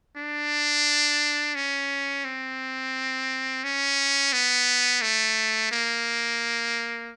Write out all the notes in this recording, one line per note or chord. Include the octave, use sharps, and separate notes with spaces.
D4
C#4
C4
C#4
B3
A3
A#3